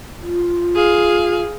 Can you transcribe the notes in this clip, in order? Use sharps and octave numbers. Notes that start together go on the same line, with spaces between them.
F4
G#4 F5